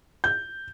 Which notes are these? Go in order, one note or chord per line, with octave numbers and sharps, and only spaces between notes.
G6